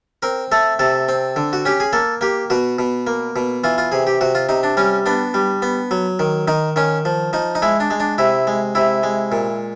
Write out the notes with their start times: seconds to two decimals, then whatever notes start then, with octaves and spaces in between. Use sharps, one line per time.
0.22 C4 A#4
0.52 A3 A4
0.79 C3 A4
1.09 C4
1.36 D3
1.53 F#4
1.65 C#4 G4
1.80 G#4
1.93 A#3 A4
2.21 A#3 G4
2.50 B2 F#4
2.79 B2
3.07 A#3
3.36 B2
3.64 E3 F4
3.78 F4
3.92 C3 G#4
4.07 G4
4.21 C3 F#4
4.35 F4
4.49 C3 D#4
4.63 D4
4.77 G3 C#4
5.06 B3 D4
5.34 G3
5.62 B3
5.91 F#3
6.19 D#3
6.48 D#3 D#4
6.76 D#3 C#4
7.05 F3
7.33 F3 D#4
7.55 D#4
7.62 G#3 E4
7.80 D4
7.90 G#3
8.00 D4
8.18 C3 E4
8.47 G#3
8.75 C3 E4
9.03 G#3
9.32 A#2